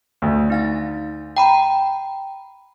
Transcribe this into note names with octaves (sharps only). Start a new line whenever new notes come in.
D2
D#4 F5 A6
G5 A#5 B5